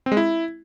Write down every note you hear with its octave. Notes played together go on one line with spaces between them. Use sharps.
C4
G#3
E4